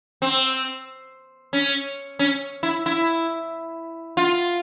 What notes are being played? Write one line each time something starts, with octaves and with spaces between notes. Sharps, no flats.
C4
C#4
C#4
E4
E4
F4